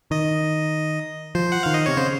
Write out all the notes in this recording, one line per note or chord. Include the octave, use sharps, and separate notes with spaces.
D#3 D#5
F3 C5
F#5
D#3 F5
D#5
C3 C#5
C#3 C5